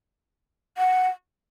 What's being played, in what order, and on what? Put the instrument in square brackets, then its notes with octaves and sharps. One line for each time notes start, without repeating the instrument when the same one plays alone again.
[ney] F#5